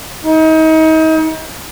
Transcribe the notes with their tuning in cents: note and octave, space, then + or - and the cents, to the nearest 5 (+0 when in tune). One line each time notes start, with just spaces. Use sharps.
D#4 +35